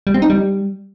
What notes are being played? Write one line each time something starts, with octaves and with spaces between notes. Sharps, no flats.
G3
C4
D#4
G3